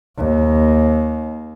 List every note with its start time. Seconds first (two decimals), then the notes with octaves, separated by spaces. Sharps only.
0.17 D#2